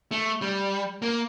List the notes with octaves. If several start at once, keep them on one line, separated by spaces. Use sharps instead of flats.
A3
G3
A#3